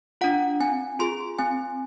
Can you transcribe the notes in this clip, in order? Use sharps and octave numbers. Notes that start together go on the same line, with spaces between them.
D4 F4 F#5
C4 G#5
F4 G#4 C6
C4 G#5